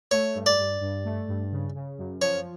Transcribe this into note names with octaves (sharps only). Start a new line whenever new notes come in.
A3 C#5
G2
D5
G2
G2
A3
G2
C#3
C#3
F#2
F3 C#5